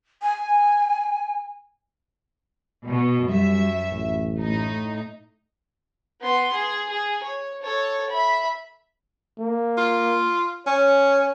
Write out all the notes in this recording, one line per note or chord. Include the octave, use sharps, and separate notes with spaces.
G#5
B2
F#2 G3 E5
A1
A2 D#4
B3 C6
G#4
G#4
C#5
A4 C#5
E5 B5
A#3
F4
C#4 C#5